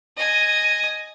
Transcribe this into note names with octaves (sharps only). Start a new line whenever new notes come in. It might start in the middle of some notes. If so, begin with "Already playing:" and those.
D#5 G#5